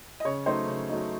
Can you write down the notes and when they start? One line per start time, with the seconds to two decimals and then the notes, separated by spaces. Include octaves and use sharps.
0.20 D#5
0.25 C#3 C#5
0.46 F#3 A3 D#4 C5
0.67 C#3
0.89 F#3 A3 D#4